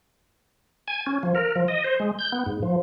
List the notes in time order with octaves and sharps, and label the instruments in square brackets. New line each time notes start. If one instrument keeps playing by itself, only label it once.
[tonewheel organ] G#5
C#4
F3
A#4
F3
D#5
C5
G#3
G6
B3
G#2
F3